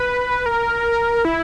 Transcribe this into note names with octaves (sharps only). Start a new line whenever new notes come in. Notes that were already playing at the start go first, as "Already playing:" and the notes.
Already playing: B4
A#4
E4